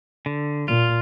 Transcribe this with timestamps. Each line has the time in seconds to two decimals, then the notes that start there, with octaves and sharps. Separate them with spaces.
0.26 D3
0.68 A#2 F4